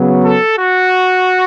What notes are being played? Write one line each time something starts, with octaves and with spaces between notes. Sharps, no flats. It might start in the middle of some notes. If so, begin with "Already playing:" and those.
Already playing: C#3 F#3 B3
A4
F#4